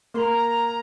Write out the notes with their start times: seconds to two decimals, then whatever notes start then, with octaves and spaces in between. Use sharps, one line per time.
0.14 A#3 A#5 C6